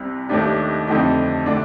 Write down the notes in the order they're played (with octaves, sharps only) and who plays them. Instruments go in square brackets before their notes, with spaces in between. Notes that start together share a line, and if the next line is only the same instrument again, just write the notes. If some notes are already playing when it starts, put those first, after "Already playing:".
Already playing: [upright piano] C2 C3 G3
D#2 D#3 A3 D4 G4
F2 D3 A3 D#4 G4
D3 A3 D4